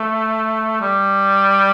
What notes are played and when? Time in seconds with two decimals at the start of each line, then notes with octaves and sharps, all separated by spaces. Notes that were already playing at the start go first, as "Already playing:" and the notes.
Already playing: A3
0.81 G3